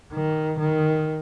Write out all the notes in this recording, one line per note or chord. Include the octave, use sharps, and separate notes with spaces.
D#3
D#3